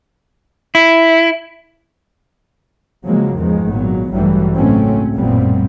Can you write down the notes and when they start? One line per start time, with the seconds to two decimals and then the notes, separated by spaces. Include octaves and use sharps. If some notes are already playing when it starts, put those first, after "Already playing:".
0.75 E4
3.06 C#3 F3 F#3 G#3 A#3
3.36 E2 G#2 D#3 F3 G#3
3.71 G#1 A#2 F#3 B3
4.12 A1 G2 E3 F#3 G3 A3
4.56 C#2 A2 F#3 A3 C4 C#4
5.15 A1 F#2 A#2 G3 B3 C4